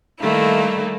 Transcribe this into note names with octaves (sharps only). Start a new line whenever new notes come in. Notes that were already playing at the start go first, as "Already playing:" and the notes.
D#3 G3 A3 A#3 E4